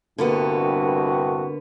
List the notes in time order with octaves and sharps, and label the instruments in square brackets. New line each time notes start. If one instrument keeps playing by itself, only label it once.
[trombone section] C2 G2 F#4 [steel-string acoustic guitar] D3 A#3 B3